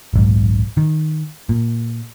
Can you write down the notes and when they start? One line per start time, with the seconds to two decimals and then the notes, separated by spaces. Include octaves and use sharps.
0.13 D#1 B1 G#2
0.77 D#3
1.49 A#2